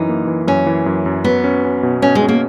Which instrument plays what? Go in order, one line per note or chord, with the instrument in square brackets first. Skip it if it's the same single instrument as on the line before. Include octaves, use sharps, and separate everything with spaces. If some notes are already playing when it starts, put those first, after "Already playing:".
Already playing: [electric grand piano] F#2 E3 [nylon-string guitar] D#4
[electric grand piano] A#3
E3
[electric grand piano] F#2 [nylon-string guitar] C#4
[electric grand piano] E3
F#2
F#2
[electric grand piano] F#3 [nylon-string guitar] B3
[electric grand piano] C#4
C#4
B2
[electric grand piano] B2 [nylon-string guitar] C#4
[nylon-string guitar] G#3
[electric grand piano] C#4
[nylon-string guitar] A#3